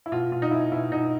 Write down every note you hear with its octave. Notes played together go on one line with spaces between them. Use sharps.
E4
B2 F4
B2 F4
D#4
B2 E4
B2 E4
B2 D#4